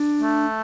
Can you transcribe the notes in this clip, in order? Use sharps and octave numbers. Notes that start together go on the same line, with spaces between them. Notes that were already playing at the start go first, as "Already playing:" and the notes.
Already playing: D4
A3